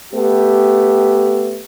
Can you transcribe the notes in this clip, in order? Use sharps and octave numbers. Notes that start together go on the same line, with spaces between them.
A3 B3 G4